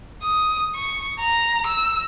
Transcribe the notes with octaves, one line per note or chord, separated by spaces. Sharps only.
D#6
C#6
A#5
E6